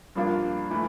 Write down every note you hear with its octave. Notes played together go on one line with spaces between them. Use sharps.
G2 F3 A#3 D4 F4
E3 A3 E4